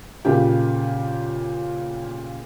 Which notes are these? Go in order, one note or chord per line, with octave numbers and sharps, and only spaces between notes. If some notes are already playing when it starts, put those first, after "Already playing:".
A#2 C#3 G4